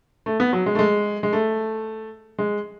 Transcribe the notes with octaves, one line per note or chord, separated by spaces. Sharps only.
A3
B3
F#3
G#3
A3
G#3
G#3
A3
G#3